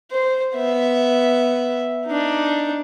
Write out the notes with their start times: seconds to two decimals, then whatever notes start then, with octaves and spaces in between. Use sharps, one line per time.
0.11 C5
0.56 B3 E5
2.07 D4 D#4